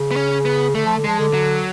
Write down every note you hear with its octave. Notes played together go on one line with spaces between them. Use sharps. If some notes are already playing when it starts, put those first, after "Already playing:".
Already playing: C#3
B3
C#4
B3
D3 A3
F3
D3
F3 G#3
D3
F#3